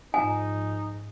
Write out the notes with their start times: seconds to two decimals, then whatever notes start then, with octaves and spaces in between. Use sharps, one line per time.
0.14 G#2 F3 D#4 G#5 D#6